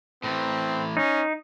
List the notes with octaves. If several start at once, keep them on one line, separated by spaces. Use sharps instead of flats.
A2 E3 C4
C#4 D#4